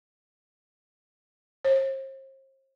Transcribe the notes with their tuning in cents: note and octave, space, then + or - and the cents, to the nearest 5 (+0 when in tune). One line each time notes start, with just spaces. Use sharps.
C5 +40